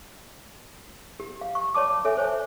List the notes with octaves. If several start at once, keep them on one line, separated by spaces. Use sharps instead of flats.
G4
F5
C#6
C#5 D5 A5 D6
A4 C#5 E5 G#5
C5 C#5 G#5